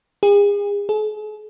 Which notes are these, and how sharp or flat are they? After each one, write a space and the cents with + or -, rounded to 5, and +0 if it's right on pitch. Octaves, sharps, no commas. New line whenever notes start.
G#4 -40
G#4 +45